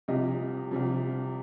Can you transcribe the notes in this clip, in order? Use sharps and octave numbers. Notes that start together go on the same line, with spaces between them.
C2 C3 F3 D#5
C2 C3 F3